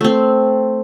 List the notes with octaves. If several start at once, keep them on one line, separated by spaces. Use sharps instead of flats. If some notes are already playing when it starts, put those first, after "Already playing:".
A3 C4